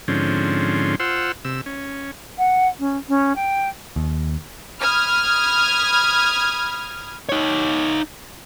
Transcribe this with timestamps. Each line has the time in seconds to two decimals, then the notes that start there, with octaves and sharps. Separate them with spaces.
0.08 G#2 D3 F3 C4 C#4
1.00 F4 C5 F#5 E6
1.45 C3 E6
1.66 C#4
2.38 F#5
2.79 C#4
3.08 C#4
3.36 G5
3.96 D#2
4.81 B5 D#6 F6 G#6
7.29 D#4 C#5